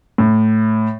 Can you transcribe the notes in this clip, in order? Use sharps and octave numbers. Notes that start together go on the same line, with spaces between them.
A2